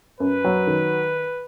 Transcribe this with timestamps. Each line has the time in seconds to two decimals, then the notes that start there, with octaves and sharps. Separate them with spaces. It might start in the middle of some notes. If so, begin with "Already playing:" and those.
0.20 F#2 B4
0.45 F#3
0.67 D#3